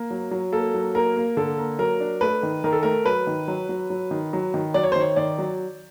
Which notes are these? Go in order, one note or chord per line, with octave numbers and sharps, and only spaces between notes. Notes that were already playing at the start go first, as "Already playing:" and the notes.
Already playing: A#3
F#3
F#3
A#3 A4
F#3
A#3 A#4
A#3
D3 A4
A#3
F#3 A#4
D4
A3 B4
D#3
D#3 A#4
A4
A3 A#4
F#3 B4
D#3
F#3
F#3
F#3
D#3
F#3
D#3
F#3 D5
C#5
C5
D#3 C#5
D#3 D5
F#3